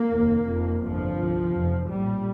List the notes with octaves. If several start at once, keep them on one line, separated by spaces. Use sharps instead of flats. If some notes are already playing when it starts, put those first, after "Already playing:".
Already playing: A#3
F1 D#2
F1 F2 C3
G1 F2 C3 F3
C2 C3
F1 F2 C3
A#1 A2 G3